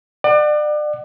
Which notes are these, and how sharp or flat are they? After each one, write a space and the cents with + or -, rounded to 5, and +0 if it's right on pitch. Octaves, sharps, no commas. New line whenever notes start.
D5 +35 F#5 +15